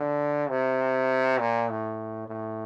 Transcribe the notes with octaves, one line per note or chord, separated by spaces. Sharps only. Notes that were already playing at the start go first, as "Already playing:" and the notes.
Already playing: D3
C3
A#2
A2
A2